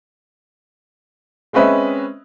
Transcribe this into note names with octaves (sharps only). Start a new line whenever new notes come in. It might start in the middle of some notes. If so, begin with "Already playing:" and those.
G#3 C4 C#4 B4 D#5 E5